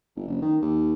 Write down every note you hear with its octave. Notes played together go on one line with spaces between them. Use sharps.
G1
F#1
D#3
D#2